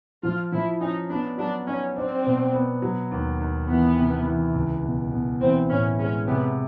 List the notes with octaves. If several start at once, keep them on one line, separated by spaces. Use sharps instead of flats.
F3 F4
F3 E4
C#4 D#4
B3 D4
F#3 D4
C#4 D#4
C4 D4
B2
B3
F#3
D#2
D#2
E3 B3
C3
E3
C#2
B2
B2
E3 C4
A2 C#4
G#3 C#4
C3 B3